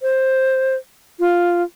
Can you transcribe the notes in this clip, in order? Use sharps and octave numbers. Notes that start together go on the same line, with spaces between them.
C5
F4